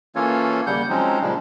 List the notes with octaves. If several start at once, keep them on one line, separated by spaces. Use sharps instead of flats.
E3 A#3 C#4 F4 A4 C#5
D#2 C#3 G3 F#5 G6
F3 F#3 G#3 C4 C#4 D#4
A#2 C#3 F3 G3 G#3 D4